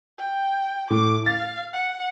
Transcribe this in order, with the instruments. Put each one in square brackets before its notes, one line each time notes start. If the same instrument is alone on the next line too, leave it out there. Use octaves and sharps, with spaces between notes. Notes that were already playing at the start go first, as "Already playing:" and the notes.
[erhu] G5
[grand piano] A2 [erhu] D6
[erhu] F5 [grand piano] A6
[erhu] F#5